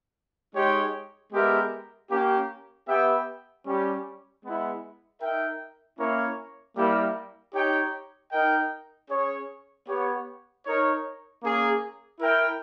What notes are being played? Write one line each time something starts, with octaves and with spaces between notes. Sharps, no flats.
G#3 D#4 G4 C#5 G5
G#3 B3 G4 A#4 E5
A#3 C#4 G4
B3 G4 B4 E5 G5
G3 C#4 G4
G#3 B3 E4
D#4 A#4 E5 G5
A#3 C#4 E4 A#4 C#5
G3 A#3 E4 G4 A#4
D#4 G4 C#5 G5
D#4 A#4 D#5 G5
C#4 G#4 C#5
B3 G4 C#5
D#4 A#4 C#5
A#3 C#4 G#4
E4 A#4 E5 G5